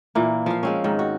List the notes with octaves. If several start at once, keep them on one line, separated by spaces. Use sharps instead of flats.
A#2 E3 A#3
F3 F5
G#3 C4 C#4
G#2 D#3
F#4